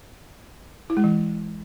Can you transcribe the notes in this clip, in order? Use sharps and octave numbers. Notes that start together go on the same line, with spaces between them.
E4
G#3
E3